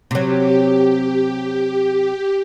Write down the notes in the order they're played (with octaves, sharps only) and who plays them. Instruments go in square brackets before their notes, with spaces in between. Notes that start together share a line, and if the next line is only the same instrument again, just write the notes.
[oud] C3 F#3 [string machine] G4